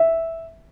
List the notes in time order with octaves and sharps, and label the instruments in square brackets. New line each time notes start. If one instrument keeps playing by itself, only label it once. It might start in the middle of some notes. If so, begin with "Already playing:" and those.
Already playing: [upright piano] E5